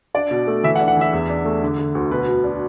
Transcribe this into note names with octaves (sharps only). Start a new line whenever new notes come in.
D4 D5
B2
A3
E3 E5
F#5
D4
F#5
E3 E5
E2
D4
A3
D3
D3
D2
B2 B4
B2
D4